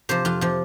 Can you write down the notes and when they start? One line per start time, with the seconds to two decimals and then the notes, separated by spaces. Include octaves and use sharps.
0.09 C3 F3 C5
0.25 F2 F4
0.41 C3 F3